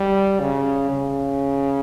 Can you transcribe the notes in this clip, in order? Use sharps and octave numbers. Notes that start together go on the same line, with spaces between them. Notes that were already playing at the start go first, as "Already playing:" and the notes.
Already playing: G3
C#3
C#3